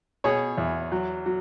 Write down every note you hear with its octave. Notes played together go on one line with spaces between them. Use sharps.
B2 G#4 C#5
E2
F#3
F#3